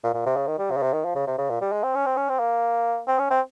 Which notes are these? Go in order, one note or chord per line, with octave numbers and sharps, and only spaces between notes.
A#2
A#2
C3
C#3
D#3
G3
C3
C#3
C3
D#3
F3
C#3
C3
C#3
A#2
G3
G#3
C4
C#4
C4
C#4
C4
A#3
C4
C#4
C4